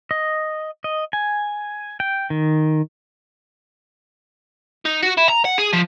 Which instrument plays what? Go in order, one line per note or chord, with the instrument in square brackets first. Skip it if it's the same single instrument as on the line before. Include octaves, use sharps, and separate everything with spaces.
[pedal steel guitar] D#5
D#5
G#5
G5
D#3
[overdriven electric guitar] D#4
F#4
E4
A#5
F#5
G#4
F3